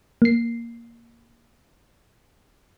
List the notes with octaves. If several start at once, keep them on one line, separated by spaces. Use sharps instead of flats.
A#3 C7